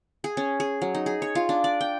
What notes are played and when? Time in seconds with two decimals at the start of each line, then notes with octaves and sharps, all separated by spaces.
0.24 G#4
0.37 C#4
0.60 G#4
0.82 F#3
0.95 D#4
1.06 G#4
1.22 C#5
1.35 F4
1.49 D4
1.64 D5
1.81 G5